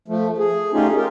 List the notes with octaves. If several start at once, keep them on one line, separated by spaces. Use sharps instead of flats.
F3 A3
G#4
A3 C#4 D#4 F4 G4 G#4
F4 G4 A#4